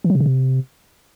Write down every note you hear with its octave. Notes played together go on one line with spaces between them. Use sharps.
E3
F#3
C3
C#3
C3